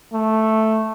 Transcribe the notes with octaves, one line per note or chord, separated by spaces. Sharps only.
A3